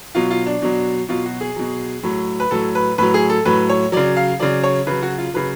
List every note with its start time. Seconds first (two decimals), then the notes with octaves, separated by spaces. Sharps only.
0.15 B2 F#3 F4
0.30 F4
0.46 D4
0.62 B2 F#3
1.09 B2 F#3 F4
1.26 F#4
1.41 G#4
1.56 B2 F#3
2.03 A2 F#3
2.40 B4
2.51 A2 F#3 A4
2.75 B4
2.98 A2 F#3 B4
3.14 G#4
3.30 A4
3.45 A2 F#3 B4
3.69 C#5
3.92 C#3 F#3 D5
4.16 F5
4.40 C#3 F#3 D5
4.64 C#5
4.87 C#3 F#3 B4
5.03 F#4
5.18 F4
5.34 C#3 F#3 B4